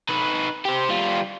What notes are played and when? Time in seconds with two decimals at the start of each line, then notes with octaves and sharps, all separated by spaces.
0.09 D#4 B4
0.65 G4 C5
0.89 G3 F4